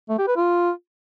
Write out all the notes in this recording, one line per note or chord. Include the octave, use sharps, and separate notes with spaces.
A3
G4
B4
F4